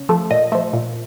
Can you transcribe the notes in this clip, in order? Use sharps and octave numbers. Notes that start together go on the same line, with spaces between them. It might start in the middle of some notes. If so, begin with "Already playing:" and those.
Already playing: C#3
F3 A3
A#2 D#5
F3 A3
A#2